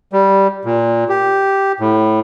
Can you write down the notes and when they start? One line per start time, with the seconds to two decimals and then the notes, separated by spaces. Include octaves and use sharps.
0.13 G3
0.65 A#2
1.09 G4
1.80 A2